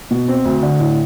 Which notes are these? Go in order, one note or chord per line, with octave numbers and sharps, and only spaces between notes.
B2
C4
D2
D3
A2